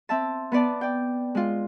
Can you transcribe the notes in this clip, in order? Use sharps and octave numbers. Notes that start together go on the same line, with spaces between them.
C4 E5 A5
B3 B4 D5 A5
D5 G5
G#3 F4